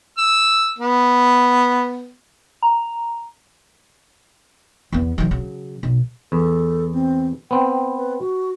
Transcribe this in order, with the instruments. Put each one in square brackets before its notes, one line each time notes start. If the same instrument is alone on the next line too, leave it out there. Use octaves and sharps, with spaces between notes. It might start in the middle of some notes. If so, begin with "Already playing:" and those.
[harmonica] E6
B3
[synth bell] A#5
[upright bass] E2 B3
D#3 F#3
C#3 F#3
B1
[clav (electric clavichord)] E2 [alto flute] A4
[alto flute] C4
[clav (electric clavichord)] B3 C4 [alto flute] G5
[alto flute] B4
F#4